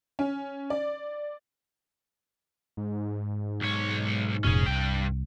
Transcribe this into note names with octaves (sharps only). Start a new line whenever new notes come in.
C#4
D5
G#2
B1 C#5
F1 A#2 C#4 G#4
C2 G2 G5